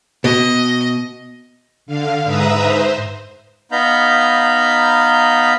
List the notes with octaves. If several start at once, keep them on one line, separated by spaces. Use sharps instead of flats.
B2 D#5
D3 F5
G#2 B4 E5 A#5 D#6
C5
B3 D#4 F5 A#5 B5 G6